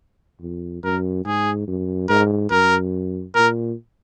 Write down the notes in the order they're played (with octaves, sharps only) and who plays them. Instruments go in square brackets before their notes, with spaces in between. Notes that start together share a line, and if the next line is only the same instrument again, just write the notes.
[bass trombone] F2
[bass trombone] F#2 [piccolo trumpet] A#4
[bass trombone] G#2 [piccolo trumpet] G#4
[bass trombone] F#2
[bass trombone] G#2 [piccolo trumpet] A#4
[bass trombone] F#2 [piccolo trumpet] A#4
[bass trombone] A#2 [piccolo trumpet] A#4